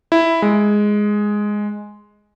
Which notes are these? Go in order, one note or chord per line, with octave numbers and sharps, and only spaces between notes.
E4
G#3